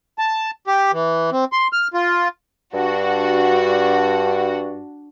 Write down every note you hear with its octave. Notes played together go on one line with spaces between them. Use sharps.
A5
G4
E3
C4
C6
F6
F4
G2 D4 F#4